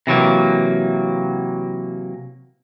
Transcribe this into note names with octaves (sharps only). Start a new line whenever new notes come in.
C3 E3 F#3 A#3